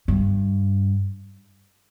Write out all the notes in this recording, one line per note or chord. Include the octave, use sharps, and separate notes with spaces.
G2